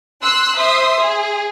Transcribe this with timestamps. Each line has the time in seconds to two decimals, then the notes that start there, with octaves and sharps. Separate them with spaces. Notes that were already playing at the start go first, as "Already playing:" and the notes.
0.22 C6 E6 F#6
0.56 C5 E5 C6 D#6
1.00 G#4